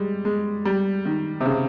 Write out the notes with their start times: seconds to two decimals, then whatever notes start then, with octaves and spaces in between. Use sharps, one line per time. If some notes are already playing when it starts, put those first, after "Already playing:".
Already playing: G3 G#3
0.25 G#3
0.65 G3
1.05 D#3
1.41 C3
1.45 C#3